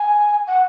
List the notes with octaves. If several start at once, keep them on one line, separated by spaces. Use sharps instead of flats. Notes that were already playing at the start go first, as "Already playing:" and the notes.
Already playing: G#5
F#5